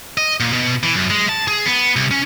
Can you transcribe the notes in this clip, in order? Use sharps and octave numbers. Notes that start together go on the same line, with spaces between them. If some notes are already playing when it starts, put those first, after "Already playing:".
D#5
A#2
B2
E3
F#2
G#3
A5
G#4
B3
C2
C#4